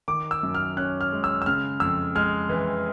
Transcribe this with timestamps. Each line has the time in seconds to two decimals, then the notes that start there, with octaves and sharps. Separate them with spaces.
0.08 D#3 D6
0.31 E6
0.43 F#2
0.55 F6
0.77 C#4 F#6
1.01 F6
1.12 G#3
1.24 E6
1.42 E6
1.46 C#3 F6
1.80 F2 E6
2.15 G#3 F6
2.49 E3